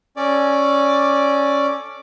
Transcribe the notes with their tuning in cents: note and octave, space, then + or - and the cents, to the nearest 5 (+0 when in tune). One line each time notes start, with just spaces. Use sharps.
C#4 +0 A4 +0 D5 +0